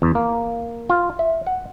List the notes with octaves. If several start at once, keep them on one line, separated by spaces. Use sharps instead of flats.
E2
A#3
F4
E5
F#5